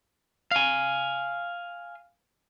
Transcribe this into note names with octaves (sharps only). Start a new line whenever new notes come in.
F5 G#5